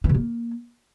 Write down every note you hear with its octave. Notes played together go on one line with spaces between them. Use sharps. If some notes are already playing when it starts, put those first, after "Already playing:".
E3
C3
A#3